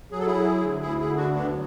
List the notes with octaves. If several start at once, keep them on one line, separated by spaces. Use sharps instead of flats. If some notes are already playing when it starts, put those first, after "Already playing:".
F#3 G#4
A4
E4 G#4
F#3
D2
D2 E4 G#4
E4 G#4
D3
D4 F#4
D2
B3 D4
F#3